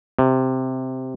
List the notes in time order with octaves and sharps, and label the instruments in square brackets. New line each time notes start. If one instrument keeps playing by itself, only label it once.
[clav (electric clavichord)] C3